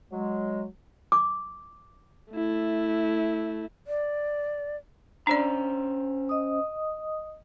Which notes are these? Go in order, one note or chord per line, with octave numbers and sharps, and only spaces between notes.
F#3 G#3
D6
A3 E4
D5
C#4 D4 C5 D5 A#5
D#5 D#6